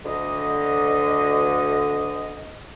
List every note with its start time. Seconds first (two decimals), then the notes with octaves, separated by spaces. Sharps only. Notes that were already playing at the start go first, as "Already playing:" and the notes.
0.05 D2 D3 D#5